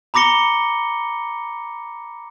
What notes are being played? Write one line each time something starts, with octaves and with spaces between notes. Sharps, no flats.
A#5 B5 D6 A#6 C#7 G7